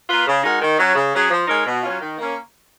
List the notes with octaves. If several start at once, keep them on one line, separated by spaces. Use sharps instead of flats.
A#3 F4 B4
C#3
G#3 D#4 F#4 A#4
D#3
F#3 C#4
C#3
F#3 C#4 G#4
F3
G#3 D#4 A#4 C#5
B2
F#3 C#4 F4
D#3
A#3 C#4